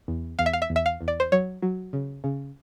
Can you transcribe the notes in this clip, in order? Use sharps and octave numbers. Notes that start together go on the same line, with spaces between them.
E2
E2 F5
E5
F5
E5
E2
E5
F5
E2
D5
C5
F#3 C#5
F#3
C#3
C#3